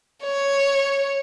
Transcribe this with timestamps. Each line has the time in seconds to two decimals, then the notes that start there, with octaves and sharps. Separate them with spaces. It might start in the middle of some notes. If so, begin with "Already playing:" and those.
0.23 C#5